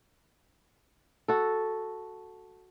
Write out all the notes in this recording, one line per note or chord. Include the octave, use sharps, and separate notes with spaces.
F#4 A4